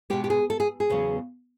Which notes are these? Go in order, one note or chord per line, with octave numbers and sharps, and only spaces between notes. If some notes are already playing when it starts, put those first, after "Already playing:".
B2 G#3 B3 G4
G4
G#4
A4
G#4
G#4
E2 C#3 F#3 B3